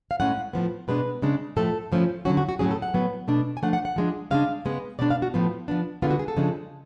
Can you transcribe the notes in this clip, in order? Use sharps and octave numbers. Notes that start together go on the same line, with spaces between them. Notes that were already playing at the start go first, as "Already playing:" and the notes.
F5
A2 G#3 C#4 F#5
A2 F3 B3
B2 G#3 D4 B4
C#3 G#3 D4
A2 F3 A3 A4
A2 F3 A3 C#4
D3 F#3 C#4 F#4
F#4
F#4
A2 F#3 C#4 G#4
A4
F#5
A2 F#3 B3
B2 A3 D4
G#5
F3 A3 D4 F#5
F#5
F#5
F3 G#3 D4
C#3 G#3 D4 F5
C#3 G#3 B3
B2 G#3 D4 D5
F5
F#4
A2 F3 B3
F3 B3 D4
D3 G#3 B3 F4
F#4
G#4
A4
C#3 F3 G#3 D4